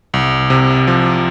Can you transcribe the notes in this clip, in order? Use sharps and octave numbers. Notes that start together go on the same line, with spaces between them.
C2
C3
F3